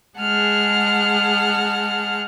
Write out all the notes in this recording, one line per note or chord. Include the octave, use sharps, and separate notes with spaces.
G#3 G#4 F#5 A5 F6